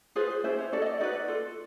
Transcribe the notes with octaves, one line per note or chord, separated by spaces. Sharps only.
F4 G#4 B4 C5
C5
C#4 E4 G4 C5
C#5
C#4 F#4 A4 D5
D#5
D5
D#4 F#4 B4 D5
F4 A4